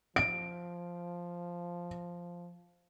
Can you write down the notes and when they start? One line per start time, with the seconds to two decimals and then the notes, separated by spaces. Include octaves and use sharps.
0.16 F3 D7